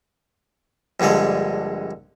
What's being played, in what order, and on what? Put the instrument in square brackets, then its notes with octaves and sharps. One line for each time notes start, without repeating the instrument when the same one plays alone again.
[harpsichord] A#1 G2 D3 G#3 D5